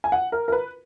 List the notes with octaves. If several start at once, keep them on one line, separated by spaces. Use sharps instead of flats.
G#5
F#5
A#4
A#4
B4